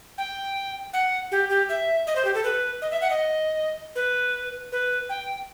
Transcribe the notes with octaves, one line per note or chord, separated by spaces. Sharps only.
G5
F#5
G4
G4
E5
D#5
C5
G4
A4
B4
D#5
E5
F#5
D#5
B4
B4
G5